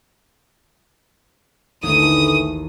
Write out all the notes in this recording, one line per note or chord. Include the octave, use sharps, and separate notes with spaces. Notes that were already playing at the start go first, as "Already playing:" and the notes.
A1 D#2 D3 E3 A3 D#6 D#7